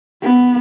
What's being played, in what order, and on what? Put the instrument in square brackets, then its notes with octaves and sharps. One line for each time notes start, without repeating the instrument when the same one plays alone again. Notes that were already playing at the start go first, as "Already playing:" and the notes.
[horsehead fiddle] B3